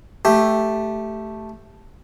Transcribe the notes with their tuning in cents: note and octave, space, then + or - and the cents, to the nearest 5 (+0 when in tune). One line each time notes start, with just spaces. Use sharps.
A3 +0 G4 -5